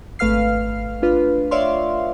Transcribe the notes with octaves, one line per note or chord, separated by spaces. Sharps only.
G#1 A3 B4 F5 F6 C7
D4 F4 B4
C#5 D5 E5 F5 C6